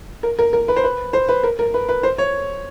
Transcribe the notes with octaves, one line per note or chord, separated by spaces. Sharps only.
A#4
A#4
A#4
B4
C5
B4
C5
B4
A#4
A#4
B4
B4
C5
C#5